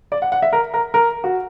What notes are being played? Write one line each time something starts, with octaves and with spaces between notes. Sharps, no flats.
D5
F#5
F#5
E5
A#4
A#4
A#4
F#4